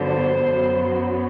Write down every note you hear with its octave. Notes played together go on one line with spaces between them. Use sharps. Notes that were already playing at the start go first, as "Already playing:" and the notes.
Already playing: G2 D3 F#3 B3 C5
F#2 F#3 B3